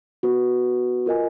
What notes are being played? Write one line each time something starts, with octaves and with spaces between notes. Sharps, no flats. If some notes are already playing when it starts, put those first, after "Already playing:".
B3 F#4 B4
F4 A#4 D#5 G#5